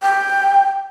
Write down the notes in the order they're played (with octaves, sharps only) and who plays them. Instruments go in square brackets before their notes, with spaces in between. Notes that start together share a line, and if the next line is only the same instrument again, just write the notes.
[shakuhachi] G5